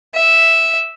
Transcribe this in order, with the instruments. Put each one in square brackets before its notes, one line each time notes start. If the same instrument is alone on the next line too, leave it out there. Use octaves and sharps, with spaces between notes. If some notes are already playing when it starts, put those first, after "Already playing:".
[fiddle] E5